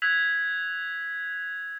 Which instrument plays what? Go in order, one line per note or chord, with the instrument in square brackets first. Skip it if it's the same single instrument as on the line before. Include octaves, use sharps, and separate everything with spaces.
[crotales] E6 F#6 G#6 B6 F7 F#7